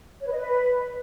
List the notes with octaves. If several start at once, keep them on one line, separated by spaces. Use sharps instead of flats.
C#5
B4
D#5
B4